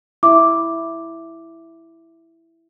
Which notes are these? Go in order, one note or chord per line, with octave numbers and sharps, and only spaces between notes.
E4 D6